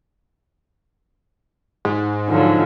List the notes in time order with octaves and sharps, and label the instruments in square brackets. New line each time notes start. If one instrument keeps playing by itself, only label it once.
[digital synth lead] G#2
[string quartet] D3 F3 F#3